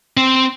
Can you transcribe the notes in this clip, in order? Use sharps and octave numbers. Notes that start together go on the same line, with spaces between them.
C4